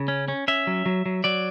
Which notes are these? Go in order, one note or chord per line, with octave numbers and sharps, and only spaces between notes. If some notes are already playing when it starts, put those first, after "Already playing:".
Already playing: C#3
C#4
C#4
C#4 E5
F#3
F#3
F#3
F#3 D5